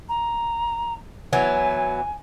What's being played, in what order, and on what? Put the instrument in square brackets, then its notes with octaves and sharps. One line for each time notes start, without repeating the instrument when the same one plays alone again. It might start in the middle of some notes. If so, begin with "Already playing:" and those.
[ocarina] A#5
[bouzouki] E3 F#3 B3 [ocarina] G#5